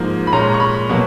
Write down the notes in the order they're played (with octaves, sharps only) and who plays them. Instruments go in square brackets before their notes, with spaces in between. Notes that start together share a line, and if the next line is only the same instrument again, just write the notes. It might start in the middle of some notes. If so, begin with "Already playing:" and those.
Already playing: [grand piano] G#2 F3 A#3
B5
A#2 G#3 C#4 A#5
C#6
B5
B2 F#3 A#3